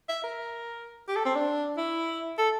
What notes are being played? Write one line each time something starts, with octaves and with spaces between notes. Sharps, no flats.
E5
A#4
G4
A4
C4
D4
E4
A4